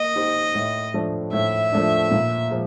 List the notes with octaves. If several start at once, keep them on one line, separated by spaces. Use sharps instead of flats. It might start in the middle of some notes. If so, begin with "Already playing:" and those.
Already playing: A#3 D#5
D#4 G4 C5
A2
F3 A3 D4
A2 E5
F3 A3 D4
A#2
F3 G#3